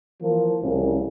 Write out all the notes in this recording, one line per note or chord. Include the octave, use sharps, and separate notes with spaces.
E3 F3 A#3
C2 A2 C#3